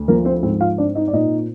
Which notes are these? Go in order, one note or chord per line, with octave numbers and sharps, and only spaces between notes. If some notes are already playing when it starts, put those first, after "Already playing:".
Already playing: D2
F3 A#3 A#4
C4 C5
G#2 C4 C5
F4 F5
C4 D4 D5
D#4 D#5
D5
A#2 D#4 D#5